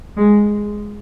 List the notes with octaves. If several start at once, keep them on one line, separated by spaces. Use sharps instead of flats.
G#3